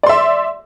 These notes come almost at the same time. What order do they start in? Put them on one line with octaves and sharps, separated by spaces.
D5 C6 E5